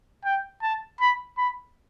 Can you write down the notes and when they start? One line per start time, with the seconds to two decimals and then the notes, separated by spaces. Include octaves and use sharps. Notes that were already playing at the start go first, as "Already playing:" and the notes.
0.24 G5
0.62 A5
1.00 B5
1.38 B5